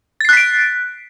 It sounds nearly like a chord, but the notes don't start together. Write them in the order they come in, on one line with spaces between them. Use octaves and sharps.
A6 C7 F#6 B6 D7